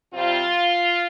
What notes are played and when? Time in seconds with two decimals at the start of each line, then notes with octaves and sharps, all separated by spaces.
0.13 C3 G3 C4 F4